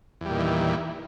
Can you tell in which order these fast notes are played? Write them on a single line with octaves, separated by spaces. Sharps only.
E2 G3 A#2 D#3 E3